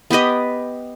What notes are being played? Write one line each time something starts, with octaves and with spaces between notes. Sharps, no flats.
B3 G4 B4 D#5